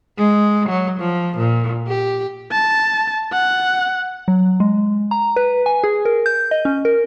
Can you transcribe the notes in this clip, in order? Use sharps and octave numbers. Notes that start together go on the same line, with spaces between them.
G#3
F#3
F3
A#2
G4
A5
F#5
F#3
G#3
A#5
B4
G#5
G#4
A#4
G6
D#5
C#4
A#4